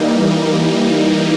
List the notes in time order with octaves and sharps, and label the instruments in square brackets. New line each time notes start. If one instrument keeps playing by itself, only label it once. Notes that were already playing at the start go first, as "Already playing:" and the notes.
Already playing: [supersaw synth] E3 G3 A#3 D#4